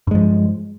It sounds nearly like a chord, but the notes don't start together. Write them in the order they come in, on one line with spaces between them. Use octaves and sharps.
G2 G#3 F3